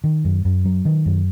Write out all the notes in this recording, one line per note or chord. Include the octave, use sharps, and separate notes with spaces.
D#3
F#2
F#2
F#3
D#3
F#2